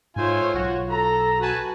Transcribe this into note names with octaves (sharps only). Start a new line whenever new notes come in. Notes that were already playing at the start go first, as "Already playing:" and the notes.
G#2 A3 F4 C5 C#5 G#5
B1 F#4
A4 A#5
F#4 B4 G#5 A5